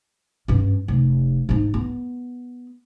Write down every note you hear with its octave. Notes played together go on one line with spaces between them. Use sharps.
G2 C#4
F1
G#2 D#4
B3